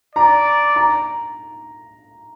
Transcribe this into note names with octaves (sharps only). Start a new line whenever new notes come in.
D5 A#5
A#5